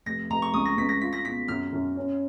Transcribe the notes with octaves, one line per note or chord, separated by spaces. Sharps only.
F1 A#6
F1 A#5
C#6
C#2 D#6
A#6
C#2 B6
A#6
F4 B6
A#6
B2 B6
F#2 F6
F#2
C#4